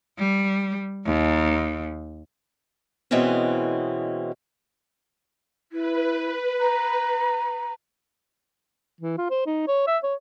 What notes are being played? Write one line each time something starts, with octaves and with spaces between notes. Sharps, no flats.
G3
D#2
B2 E3 G#3 C4 C#4
E4 B4
A#5
E3
F4
C5
D#4
C#5
E5
C#5